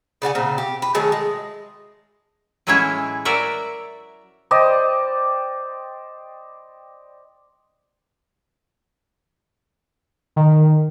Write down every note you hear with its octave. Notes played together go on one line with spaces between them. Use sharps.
C#3 D5 F#5 G#5
A#2 C#3 C4
G4
B4
D#3 F#3 A3 G#4
G#3
A2 E3 F#3 G#3 C#4 E4
F#4 A#4 D5 E5
C5 D5 D#5 G5
D#3